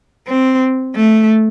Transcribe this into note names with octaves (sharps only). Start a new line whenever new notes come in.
C4
A3